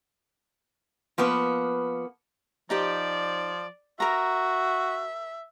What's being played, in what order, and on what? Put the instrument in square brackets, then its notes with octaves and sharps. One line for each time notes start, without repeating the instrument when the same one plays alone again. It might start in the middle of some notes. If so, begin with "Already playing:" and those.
[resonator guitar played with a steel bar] F3 A#3 B3 B4
[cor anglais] F3 [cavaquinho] D#4 G4 C5 [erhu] D5
[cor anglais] F#4 [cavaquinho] A#4 A#5 [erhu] E5